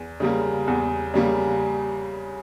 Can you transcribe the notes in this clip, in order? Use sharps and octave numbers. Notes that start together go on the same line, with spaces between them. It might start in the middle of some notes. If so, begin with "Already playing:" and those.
Already playing: E2
C#3 G3 A#3
E2
C#3 G3 A#3